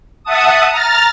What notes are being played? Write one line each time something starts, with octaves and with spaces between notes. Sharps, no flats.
E5 F#5 A5 D#6
A#5 F6 A6